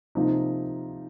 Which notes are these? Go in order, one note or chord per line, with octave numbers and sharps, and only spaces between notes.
C3 F3 A#3 D#4